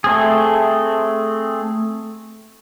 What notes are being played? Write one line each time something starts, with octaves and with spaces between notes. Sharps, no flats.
A3 C4 G#4